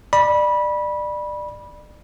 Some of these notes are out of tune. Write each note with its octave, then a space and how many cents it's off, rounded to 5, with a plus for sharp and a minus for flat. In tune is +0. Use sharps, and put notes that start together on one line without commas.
D5 +25 B5 -20